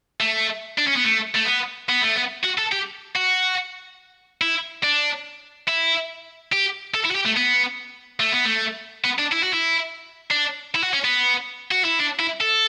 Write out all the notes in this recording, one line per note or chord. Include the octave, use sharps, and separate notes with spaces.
A3
D4
C#4
B3
A3
A3
B3
B3
A3
B3
F#4
A4
G4
F#4
E4
D4
E4
G4
A4
E4
F#4
G4
A3
B3
A3
B3
A3
B3
D4
E4
F#4
E4
D4
E4
F#4
C#4
B3
F#4
E4
D4
E4
A4